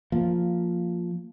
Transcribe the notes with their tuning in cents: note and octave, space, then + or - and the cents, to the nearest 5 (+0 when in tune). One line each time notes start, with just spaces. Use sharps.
F3 +0 A#3 -10